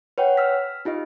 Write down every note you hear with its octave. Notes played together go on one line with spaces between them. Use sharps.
B4 C#5 F#5 G5
E6 F6 B6
D#4 F4 G4 D#5